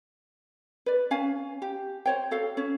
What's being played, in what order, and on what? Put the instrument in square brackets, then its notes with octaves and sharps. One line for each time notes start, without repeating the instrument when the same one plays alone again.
[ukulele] B4 D5
C#4 F5 G#5
G4
C5 C#5 G5
F#4 A4 F5
C#4 C#5